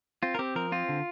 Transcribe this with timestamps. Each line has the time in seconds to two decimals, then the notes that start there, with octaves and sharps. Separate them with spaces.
0.23 C4 F4
0.35 A#4
0.39 C4 G4
0.55 F3 A#4
0.72 C4 F4
0.89 D3